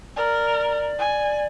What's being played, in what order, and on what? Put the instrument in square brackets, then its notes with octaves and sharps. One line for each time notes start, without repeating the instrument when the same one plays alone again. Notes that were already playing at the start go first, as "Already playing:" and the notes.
[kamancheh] A#4 [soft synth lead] D5
[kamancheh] G#5